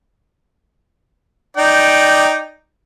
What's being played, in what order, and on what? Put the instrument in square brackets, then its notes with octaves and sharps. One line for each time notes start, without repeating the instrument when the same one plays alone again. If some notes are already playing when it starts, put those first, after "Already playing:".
[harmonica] D#4 D5 G5